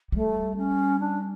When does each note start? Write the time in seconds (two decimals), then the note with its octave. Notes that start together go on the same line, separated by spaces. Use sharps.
0.12 G3 A3
0.57 C#4
1.00 D4